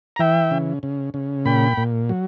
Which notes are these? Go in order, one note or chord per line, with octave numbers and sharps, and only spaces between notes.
A#5
E3 E5 G5
C#3
C#3
C#3
A#2 G5 B5
A#2
F#3